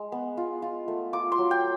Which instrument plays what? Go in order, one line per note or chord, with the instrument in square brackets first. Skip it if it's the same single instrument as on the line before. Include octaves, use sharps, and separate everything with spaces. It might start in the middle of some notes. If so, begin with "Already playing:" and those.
Already playing: [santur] G#3
B3
F4
F4
A3
F4 D6
C6
F#3
G5